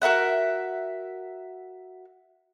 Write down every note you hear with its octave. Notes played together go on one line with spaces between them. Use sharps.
F#4 A#4 E5 F#5